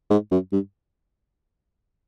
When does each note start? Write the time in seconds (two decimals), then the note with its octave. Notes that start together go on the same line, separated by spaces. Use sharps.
0.10 G#2
0.32 F#2
0.52 G2